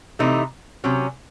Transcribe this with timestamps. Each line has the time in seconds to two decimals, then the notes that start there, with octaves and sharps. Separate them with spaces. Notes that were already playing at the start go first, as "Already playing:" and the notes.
0.19 C3 E3 A3 D#4
0.84 C3 F#3 C#4